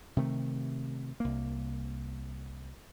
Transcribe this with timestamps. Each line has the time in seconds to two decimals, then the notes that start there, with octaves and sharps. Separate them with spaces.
0.17 C3 D#3 A3
1.20 C2 A#3